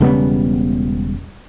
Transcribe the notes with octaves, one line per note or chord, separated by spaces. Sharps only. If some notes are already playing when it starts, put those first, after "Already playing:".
E1 C#3 G3 B3